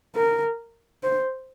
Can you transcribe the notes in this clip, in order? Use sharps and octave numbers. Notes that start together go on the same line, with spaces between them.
A#4
C5